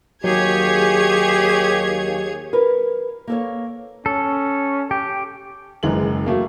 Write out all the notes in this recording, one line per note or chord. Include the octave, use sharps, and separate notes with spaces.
D#2 F#3 G4 G#4 C#5 G#6
A#4 B4
A#3 A4 C#5
C#4 A4
G4 G5
F#1 F#2 E3 G#3 A#4 F#7
F#3 A3 A#3